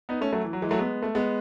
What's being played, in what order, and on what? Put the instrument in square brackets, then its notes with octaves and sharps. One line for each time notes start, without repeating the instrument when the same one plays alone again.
[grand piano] B3 D#4
A3 C#4
F#3 A3
E3
F#3
E3 G#3
F#3 A3
G#3 B3
A3
G#3 B3